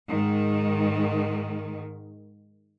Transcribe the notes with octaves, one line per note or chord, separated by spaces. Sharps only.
G#2 D#3